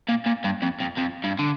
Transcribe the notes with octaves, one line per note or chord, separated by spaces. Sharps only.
A#2
A#2
G2
F2
F2
F2
G2
D3